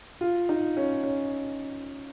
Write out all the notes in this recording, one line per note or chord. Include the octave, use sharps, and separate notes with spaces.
F4
D#4
C#4
C#4